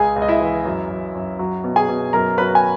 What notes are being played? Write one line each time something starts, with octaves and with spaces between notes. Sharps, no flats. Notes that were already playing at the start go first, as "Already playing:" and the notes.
Already playing: C#2 G#4 G#5
C#2
D#5
E4 E5
E3
F#2
F#2
F#2
F#3
B2
G#4 G#5
B2
F#2 A#4 A#5
F#3 B4 B5
G#5